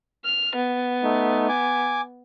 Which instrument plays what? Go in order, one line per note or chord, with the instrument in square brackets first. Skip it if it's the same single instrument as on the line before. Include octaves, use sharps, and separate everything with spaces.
[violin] F6
B3
[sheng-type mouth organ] A3 D#4
G#5 D6